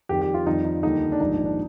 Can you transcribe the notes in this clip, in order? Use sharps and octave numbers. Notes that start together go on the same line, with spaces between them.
F2 D#3 G3 G4
G4
F4
F2 D#3 G3 D#4
D#4
D#2 D3 G3 D#4
D4
A#1 G#2 D#3 G3 D#4
D4
D4